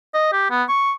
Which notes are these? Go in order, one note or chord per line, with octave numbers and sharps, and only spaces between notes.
D#5
G4
B3
C#6